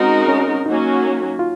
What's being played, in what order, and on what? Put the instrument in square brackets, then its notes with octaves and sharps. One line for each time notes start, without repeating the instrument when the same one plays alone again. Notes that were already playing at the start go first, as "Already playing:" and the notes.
Already playing: [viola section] G#3 D#4 F#4 A#4 [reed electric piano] C4 C#4
[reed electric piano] C#4
[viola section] F#3 A#3 C#4 F#4 [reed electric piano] D#4
[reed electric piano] F4